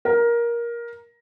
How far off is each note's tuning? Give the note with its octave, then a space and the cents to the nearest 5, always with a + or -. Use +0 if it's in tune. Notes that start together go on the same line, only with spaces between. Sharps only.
A#4 +15